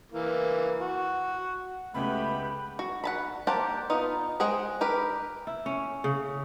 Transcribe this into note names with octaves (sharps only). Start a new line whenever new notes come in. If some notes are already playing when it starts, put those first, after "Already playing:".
E3 A#3
F#4
C#2 C#3 G#3 A3 B3 G4 B5
F#4
F#5 A5 B5
A#3 G4 C5 F#5 A5
B3 D#4 F4
G#3 G#4 C5 F#5 G5
G4 A#4 B4
E4
C#4
C#3